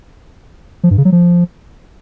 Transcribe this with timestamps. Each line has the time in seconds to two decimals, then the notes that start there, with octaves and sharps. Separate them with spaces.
0.84 F3
0.91 G2
0.98 C#3
1.05 F#3
1.12 F3